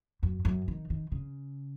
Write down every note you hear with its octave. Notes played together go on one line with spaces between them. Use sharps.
F#2
F#2
D#3
D#3
C#3